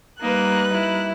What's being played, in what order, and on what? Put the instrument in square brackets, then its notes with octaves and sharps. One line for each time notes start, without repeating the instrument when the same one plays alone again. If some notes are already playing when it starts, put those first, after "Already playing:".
[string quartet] G3 F#6 [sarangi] A#3 [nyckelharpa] D#4 B4
[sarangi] E4